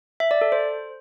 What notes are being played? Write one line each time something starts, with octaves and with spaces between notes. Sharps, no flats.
E5
D5
A4
C5